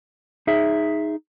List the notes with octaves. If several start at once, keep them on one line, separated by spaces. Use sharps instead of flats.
D#4 G#4 E5